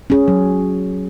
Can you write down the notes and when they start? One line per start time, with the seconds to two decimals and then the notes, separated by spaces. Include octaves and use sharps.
0.10 C#4 G#4
0.28 F#3